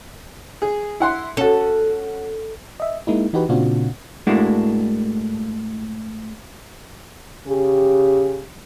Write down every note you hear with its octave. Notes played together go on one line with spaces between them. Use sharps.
G#4
E4 F#5 C6
C#4 F#4 A4
D#5 E5
G#3 A#3 D#4 E4
E3 D#4 F#4 G4 B4
A#2 C#3 C4 D4 F4 F#4
A2 G#3 A#3 D4 E4 F#4
C#3 G4